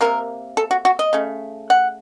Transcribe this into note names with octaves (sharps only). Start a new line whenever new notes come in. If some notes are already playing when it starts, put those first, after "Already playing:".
C3 F3 A#3 A#4
A4
F#4
F#4
D#5
C#3 A3
F#5